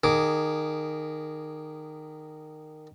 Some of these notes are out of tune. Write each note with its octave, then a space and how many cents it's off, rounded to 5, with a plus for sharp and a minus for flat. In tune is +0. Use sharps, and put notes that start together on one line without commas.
D#3 -15 G#4 +0 D6 -10